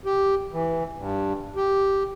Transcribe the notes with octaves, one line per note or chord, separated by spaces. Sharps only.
G4
E3
G2
G4